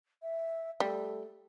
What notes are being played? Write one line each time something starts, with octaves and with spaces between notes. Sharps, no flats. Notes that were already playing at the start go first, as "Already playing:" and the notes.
E5
G3 A3